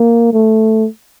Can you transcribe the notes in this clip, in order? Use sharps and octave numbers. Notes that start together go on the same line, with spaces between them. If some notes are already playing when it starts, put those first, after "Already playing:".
Already playing: A#3
A3